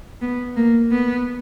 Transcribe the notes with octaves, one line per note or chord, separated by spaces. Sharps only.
B3
A#3
B3